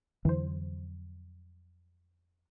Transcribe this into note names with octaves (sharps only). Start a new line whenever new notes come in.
F2 D3 E3 F#3 C5